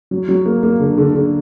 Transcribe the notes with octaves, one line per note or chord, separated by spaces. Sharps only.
F#3
F#3
A#3
A#3
D3
D3
D3